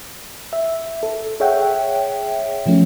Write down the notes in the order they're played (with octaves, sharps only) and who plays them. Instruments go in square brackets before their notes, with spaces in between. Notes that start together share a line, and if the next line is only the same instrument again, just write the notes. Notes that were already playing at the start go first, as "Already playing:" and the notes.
[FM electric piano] E5
A4
G#4 C#5 E5 F#5 G5
B2 F3 A3 C#4